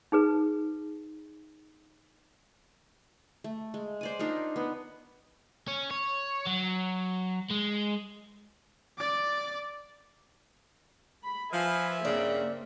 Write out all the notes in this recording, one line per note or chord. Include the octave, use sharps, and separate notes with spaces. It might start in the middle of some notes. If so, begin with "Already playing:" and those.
D#4 G#4 B4
A3
G#3
C5 D5 G#5
D4 D#4 F4 A#4
B3
C#4
C#5
F#3
G#3
D5 D6
B5
F3 B4 E5 G#5
G2 C#3 A#3 C4 D5